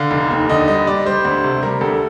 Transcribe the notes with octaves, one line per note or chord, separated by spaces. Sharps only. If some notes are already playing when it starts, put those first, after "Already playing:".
Already playing: D3 F5
F1
D#2
D3 D#5
G3 D#5
G3 D5
G3 C5
D2
C3
G3 A#4
D2 A4